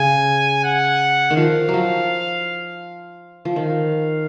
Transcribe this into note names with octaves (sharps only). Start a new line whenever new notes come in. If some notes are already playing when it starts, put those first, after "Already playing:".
Already playing: C#3 G#5
F#5
D#3
F3 F5
F#3
F3
F3
D#3 F5